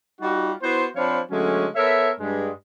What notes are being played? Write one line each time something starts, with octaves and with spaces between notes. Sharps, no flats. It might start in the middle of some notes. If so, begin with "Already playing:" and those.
G3 D#4 F4 F#4
B3 E4 F#4 C5
F3 C4 D4 C#5 F5 B5
D3 F#3 G#3 A3 C#4
B3 A4 A#4 C#5 E5
G2 G#3